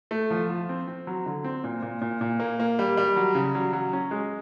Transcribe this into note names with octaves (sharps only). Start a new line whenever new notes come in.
A3
F3
F3
C4
C4
F#3
D3
C4
A#2
A#2
A#2
A#2
A#3
A#3
G3
G3
F#3
C#3
F#3
F#3
C#4
G#3